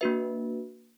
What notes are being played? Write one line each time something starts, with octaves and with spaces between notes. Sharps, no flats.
A#3 D4 F#4 B4 E5